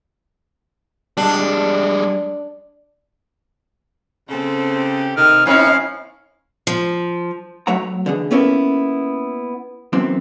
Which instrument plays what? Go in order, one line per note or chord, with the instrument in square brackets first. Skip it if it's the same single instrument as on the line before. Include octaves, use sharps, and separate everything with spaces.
[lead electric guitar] G3 G#3 [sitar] D4
[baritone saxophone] C#3 [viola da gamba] C4 A4
[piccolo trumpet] G4
[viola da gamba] C3 [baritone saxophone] D#3 [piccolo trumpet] F6
[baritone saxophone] F#2 [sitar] A2 D#4 C#5 [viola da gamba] C4 C#4 E4 [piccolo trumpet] F5
[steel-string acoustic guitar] F3
[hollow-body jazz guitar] F#3 A3 C#5 F#5 A#5
D3 E3 G#4
A#3 B3 C#4 E4 A4 A#4
F#2 E3 B3 C4 C6